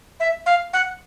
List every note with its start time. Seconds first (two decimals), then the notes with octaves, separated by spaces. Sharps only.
0.20 E5
0.46 F5
0.73 F#5